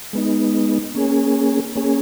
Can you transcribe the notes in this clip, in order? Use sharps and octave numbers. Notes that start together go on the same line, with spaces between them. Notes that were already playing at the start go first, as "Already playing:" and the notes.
G#3 B3 D#4
A#3 C#4 G#4
A#3 C#4 G#4